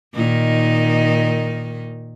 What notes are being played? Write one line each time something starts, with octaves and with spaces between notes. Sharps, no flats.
A#2 D#3 D#4